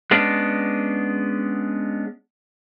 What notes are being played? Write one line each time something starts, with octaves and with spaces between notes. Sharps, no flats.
G#3 B3 C#4 D4